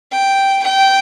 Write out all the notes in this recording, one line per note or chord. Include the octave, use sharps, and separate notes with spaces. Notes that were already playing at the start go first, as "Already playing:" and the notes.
G5
G5